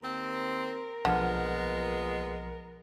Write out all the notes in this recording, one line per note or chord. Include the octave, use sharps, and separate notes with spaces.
D#2 C4 A#4
B1 A#2 D3 F3 G#3 B3 F6